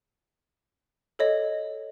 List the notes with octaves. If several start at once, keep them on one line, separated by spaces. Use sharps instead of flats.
A4 C#5 D#5